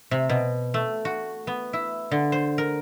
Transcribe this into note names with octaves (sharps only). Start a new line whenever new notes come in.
C3
B2
A3
F#4
B3
E4
D3
C5
A#4